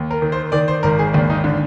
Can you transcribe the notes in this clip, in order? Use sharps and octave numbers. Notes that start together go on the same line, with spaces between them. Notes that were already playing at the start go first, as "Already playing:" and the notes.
Already playing: D#2
A#4
D#3
C5
D#3 D5
C5
G#1 A#4
G#4
D#2 D4
D#4
D3